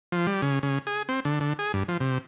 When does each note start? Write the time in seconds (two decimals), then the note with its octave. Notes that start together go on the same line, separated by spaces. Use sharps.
0.12 F3
0.27 G3
0.42 C#3
0.63 C#3
0.87 G#4
1.09 C4
1.25 D3
1.41 D3
1.59 G#4
1.74 G2
1.89 F3
2.00 C3